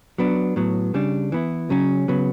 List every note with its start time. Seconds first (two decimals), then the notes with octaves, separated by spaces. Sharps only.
0.18 F#3 B3 D4
0.56 A2 F#3 B3
0.94 C#3 G3 D4
1.32 E3 B3 E4
1.70 C#3 F#3 C#4
2.08 C#3 F#3 B3